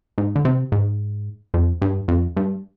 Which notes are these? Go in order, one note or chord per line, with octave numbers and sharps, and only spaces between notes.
G#2
D3
C3
G#2
F2
G2
F2
G2